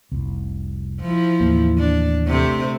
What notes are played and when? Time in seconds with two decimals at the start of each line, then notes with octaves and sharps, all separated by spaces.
0.12 F1 C2
1.01 F3 E4
1.40 A1 D#2 A#3
1.78 D4
2.27 C3 A3 C4